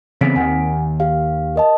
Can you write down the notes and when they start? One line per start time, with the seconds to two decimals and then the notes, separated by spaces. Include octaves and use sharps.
0.21 C#3 E3 B3 C4 B6 D7
0.36 D#2 D#3 F#5 G#5
1.00 G4 F5
1.56 A#4 D#5 A5